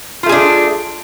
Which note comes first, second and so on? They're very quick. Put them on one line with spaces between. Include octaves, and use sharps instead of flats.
F4 A3 G#4 D4